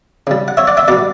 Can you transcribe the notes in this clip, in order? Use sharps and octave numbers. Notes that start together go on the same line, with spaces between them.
C#3 G3
F#5
C#5 E5
D5 F#5
E5 G5
B2 G3 D5 F#5